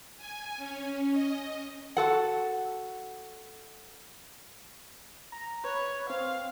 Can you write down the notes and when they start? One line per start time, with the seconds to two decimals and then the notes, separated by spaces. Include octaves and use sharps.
0.17 G#5
0.57 C#4
1.12 D#5
1.97 F#4 A4 F#5
5.32 A#5
5.64 B4 C#5
6.10 C4 F5